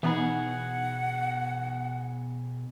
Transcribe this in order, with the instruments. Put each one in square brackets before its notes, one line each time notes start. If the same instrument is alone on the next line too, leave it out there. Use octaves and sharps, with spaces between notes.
[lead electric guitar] B2 G#4 [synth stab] E3 B3 D#4 [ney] F#5